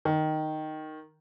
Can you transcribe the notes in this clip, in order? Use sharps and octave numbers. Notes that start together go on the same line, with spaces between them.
D#3